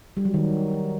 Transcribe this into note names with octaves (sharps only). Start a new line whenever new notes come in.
G3
F#3
D#3